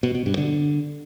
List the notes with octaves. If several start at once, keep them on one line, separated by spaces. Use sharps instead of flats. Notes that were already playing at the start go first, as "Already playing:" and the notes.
B2
B2
G2
D3